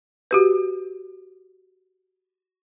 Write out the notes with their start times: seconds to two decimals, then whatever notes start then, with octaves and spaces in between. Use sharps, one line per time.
0.31 F#4 G4 B4